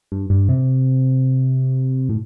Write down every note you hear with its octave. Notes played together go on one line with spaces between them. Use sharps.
G2
G2
C3
A2